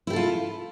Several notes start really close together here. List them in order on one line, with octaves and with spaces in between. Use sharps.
E4 G4 A4 F4